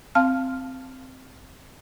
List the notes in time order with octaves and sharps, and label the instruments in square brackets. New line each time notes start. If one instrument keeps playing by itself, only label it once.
[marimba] C4 F5 A5 F6